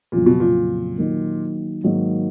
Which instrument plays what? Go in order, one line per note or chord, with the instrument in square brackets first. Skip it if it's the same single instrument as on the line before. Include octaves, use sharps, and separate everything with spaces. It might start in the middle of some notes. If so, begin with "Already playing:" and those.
[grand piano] F2 C#3 F#3 [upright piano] A#2
[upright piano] B2
A#2
[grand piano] D#3 F#3 A#3
G#2 D#3 F#3 A#3